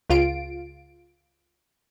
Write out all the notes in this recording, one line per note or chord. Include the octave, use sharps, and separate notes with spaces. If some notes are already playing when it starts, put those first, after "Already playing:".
C#2 F4 D7